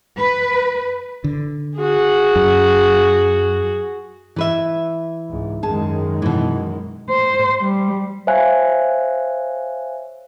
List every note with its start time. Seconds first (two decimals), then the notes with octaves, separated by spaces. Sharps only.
0.18 B4
1.24 D3
1.77 F#4 G#4
2.36 F#2
4.36 E3 B4 E5
5.28 C#2 G#2
5.63 F#2 D#3 G#3 G#4 A5
6.22 B2 E3
7.10 C5
7.61 G3
8.27 C5 C#5 E5 F5 G#5 F#6